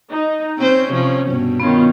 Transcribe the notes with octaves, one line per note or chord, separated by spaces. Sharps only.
D#4
C4 C#4 C5
C3 F3
G2 B2
D#3 B3 C#4 F4